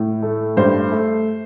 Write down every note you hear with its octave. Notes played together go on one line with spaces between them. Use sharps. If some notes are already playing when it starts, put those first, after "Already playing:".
Already playing: A2
A3
G2 C5
A3